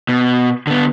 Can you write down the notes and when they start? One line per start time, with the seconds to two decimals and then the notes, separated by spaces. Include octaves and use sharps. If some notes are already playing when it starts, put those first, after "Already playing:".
0.09 B2
0.67 D3 B3